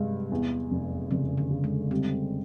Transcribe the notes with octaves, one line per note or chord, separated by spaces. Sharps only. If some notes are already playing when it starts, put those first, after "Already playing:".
Already playing: G2 C3 G#3
E2
F1
F1 C#3
D3
C#3
G#3
G3 C4